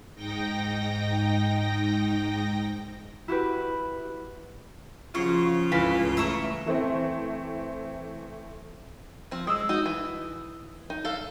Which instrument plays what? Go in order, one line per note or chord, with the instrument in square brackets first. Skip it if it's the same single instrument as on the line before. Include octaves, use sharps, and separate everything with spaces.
[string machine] G#2 D#4 G5 A#6
[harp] E4 F#4 G4 B4
[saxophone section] C#3 F4 [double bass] F3 [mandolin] F#4 C6
[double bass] C#2 G2 [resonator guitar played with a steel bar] E3 [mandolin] A4 F5 B5
[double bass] A3 [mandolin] E5 A#5 C#6
[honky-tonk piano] E3 A3 C4
[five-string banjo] F3 C4
[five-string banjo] G#3 [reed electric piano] D#6 E6
[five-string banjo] D#4 F#4
E3
D#4
A4 F5